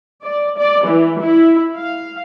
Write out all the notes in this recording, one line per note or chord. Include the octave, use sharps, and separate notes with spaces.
D5
D5
E3
E4
F5